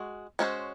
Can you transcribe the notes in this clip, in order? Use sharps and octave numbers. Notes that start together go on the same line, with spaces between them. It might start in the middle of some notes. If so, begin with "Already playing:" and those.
Already playing: G#3 F#4
G#3 C#4 F#4 A4 C5